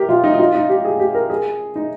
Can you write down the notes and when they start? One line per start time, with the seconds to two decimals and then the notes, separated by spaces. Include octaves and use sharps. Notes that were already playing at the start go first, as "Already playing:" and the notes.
Already playing: G4 A#4
0.09 F4
0.24 D#4
0.34 D#4
0.39 F4
0.54 D#4
0.69 G4
0.85 G#4
1.00 G4
1.14 A#4
1.30 G#4
1.76 D#4